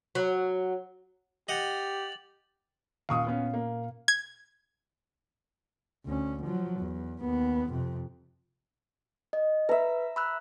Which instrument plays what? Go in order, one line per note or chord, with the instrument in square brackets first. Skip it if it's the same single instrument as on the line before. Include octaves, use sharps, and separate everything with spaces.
[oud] F#3
[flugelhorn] G4 [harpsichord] D#5 F#5 [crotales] A6 F7 F#7
[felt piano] D#2 C#6 D#6 [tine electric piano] A#2 F5
[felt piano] B3 C#4
A#3
[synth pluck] G#6
[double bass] D2 C#4
F3 F#3
E2
D#2 B3
F2 C3
[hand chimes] D#5
[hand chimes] B4 [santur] E5 A#5
[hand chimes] B5 E6 F#6